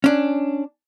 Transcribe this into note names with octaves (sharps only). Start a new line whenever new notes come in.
C#4 D4